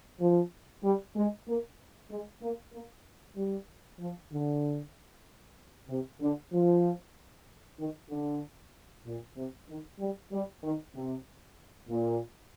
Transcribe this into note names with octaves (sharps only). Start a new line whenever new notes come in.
F3
G3
G#3
A#3
G#3
A#3
A#3
G3
F3
D3
C3
D3
F3
D#3
D3
A#2
C3
D#3
G3
G3
D#3
C3
A#2